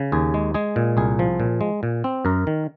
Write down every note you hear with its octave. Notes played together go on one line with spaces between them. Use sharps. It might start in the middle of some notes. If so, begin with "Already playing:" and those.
Already playing: C#3
D#2 G#4
G#3
G#3 G#4
A#2
C2 G#4
F3
A#2
G#3
A#2
C4
F#2 A#4
D#3